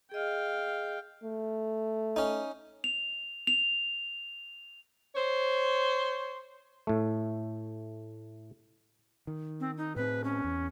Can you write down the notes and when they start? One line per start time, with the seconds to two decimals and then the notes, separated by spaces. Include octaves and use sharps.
0.12 G#4 D#5 F5 G5
1.24 A3
2.16 C#4 D#4
2.84 F7
3.47 F7
5.14 C5 C#5
6.87 A2 A3
9.27 D#3
9.60 C4
9.77 D#4
9.96 A2 C4 B4
10.24 C#4
10.45 E2